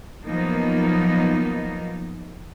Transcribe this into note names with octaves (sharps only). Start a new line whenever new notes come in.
F3 F#3 A#3 B3 D#4